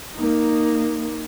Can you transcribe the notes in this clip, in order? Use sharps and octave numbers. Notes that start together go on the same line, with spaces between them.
A#3 D#4